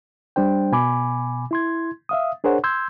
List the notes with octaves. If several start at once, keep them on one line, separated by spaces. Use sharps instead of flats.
G3 D4 C5 G5
B2 G#5 B5 D6
E4 C6 G#6
E5 F5 D#6
D4 G#4 A#4 C5 C#5 F#5
C6 E6 G6 G#6